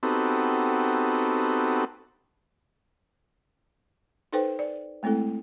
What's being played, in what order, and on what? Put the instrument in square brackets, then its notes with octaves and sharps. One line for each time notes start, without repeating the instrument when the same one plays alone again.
[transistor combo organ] B3 C4 D#4 F#4 G4 A4
[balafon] D#4 A4 B4 C5 G5
D5
G#3 A3 C4 E4 A4